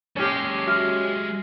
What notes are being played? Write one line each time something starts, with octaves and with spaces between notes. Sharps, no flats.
G#3 C#4 G4 A4
F#4 E5 F6